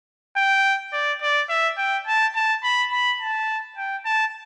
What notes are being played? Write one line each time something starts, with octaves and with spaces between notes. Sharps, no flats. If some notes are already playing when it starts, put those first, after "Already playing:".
G5
D5
D5
E5
G5
A5
A5
B5
B5
A5
G5
A5